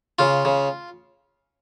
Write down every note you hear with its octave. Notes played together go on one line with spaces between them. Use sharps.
C#3 F4
C#3